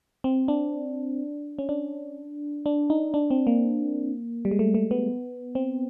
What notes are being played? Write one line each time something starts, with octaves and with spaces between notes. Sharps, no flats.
C4
D4
C#4
D4
D4
D#4
D4
C4
A#3
G3
G#3
A3
A3
B3
C4